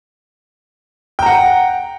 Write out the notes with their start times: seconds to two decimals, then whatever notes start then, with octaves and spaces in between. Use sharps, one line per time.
1.19 G5
1.23 A#5
1.26 F#5